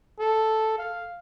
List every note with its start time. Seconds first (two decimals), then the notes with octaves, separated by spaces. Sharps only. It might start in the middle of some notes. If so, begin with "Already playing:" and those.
0.20 A4
0.79 F5